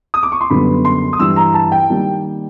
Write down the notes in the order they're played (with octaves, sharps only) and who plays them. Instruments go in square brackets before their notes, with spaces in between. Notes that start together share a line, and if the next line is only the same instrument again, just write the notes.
[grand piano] D#6
D6
C#6
C6
F#2 D3 G3 B3 B5
C6
D#6
G2 E3 G3 E6
A#5
A5
G5
D#3 G3 A#3